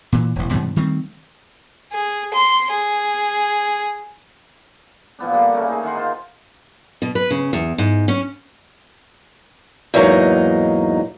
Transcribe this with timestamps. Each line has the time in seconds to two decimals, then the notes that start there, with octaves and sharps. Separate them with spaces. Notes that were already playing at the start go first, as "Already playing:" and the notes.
0.12 A#2 E3
0.36 E1 A1
0.51 G#2 C3 E3 G3
0.76 D#3 G3 A3 C4
1.93 G#4
2.34 C6
2.71 G#4
5.19 A#2 F3 B3 D4
5.31 D3 G3 A#3 B4
5.53 C#3 A3 A#3
5.68 D#4 G#4
5.83 D#3 E5 F#5 C6
5.95 D#4 F4 C5
7.02 B2
7.15 B4
7.31 C#3
7.53 E2
7.78 G#2
8.08 C#4
9.94 E2 G#2 F#3 A#3 D#4